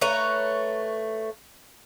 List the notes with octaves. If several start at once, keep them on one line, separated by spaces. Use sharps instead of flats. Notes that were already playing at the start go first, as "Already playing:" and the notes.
A3 B4 C#5 A#5